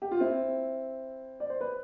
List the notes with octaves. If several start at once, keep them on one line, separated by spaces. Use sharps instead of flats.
G4
F4
C4 E4
D5
C5
B4